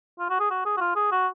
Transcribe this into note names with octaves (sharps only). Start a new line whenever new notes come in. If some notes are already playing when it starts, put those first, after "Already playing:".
F4
F#4
G#4
F#4
G#4
F#4
F4
G#4
F#4